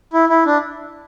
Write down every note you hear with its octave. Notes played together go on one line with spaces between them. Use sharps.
E4
E4
D4